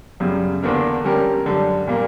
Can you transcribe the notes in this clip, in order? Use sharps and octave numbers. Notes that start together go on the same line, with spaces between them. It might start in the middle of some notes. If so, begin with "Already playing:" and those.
F#2 C#3 G3
E2 D3 A#3 D4 A#4
D3 G3 C#4 G4 A#4
F#2 D3 G3
A#2 G3 A#3